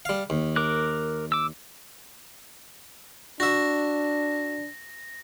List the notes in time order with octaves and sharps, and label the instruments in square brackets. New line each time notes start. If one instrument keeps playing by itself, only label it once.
[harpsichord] G3 F5
D#2
[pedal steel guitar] A#4 D6 F#6
D6 E6
[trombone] D4 [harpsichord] F#4 E5 [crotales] A#6